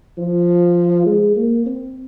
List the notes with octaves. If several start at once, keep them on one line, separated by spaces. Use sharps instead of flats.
F3
G#3
A#3
C4